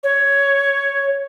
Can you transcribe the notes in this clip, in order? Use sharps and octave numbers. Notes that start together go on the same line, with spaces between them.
C#5